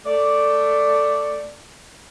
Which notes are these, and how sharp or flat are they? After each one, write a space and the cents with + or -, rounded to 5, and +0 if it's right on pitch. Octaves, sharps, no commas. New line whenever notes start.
A3 +15 D5 +0